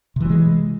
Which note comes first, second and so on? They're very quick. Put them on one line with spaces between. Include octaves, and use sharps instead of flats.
C3 E3 F#3 G#3